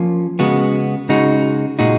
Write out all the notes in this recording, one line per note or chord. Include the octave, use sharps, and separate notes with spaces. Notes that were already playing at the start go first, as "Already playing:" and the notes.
Already playing: F3 A#3 C#4 F4
C#3 G#3 B3 F#4
C#3 G#3 D#4 F#4
A#2 G#3 D#4 F#4